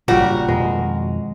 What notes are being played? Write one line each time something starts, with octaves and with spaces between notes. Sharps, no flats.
G1 A#2 C#3 G3 F#4 A#4 F#5
F2 B2 D#3 G#3